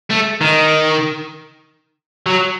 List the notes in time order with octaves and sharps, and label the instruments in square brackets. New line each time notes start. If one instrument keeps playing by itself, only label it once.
[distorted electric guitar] A3
D#3
F#3